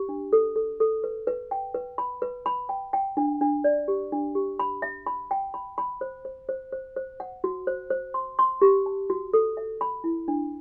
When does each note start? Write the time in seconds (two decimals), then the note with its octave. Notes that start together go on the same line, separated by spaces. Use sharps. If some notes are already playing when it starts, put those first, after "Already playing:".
Already playing: G4
0.09 D4
0.33 A4
0.56 A4
0.80 A4
1.04 B4
1.27 B4
1.51 G5
1.75 B4
1.98 B5
2.22 B4
2.46 B5
2.69 G5
2.93 G5
3.17 D4
3.41 D4
3.64 D5
3.88 G4
4.12 D4
4.35 G4
4.59 B5
4.82 E5
5.07 B5
5.31 G5
5.54 B5
5.78 B5
6.01 C5
6.25 C5
6.49 C5
6.72 C5
6.96 C5
7.20 F#5
7.44 F#4
7.67 C5
7.90 C5
8.14 C6
8.39 C6
8.62 G4
8.86 A5
9.10 F#4
9.34 A4
9.57 E5
9.81 B5
10.04 E4
10.28 D4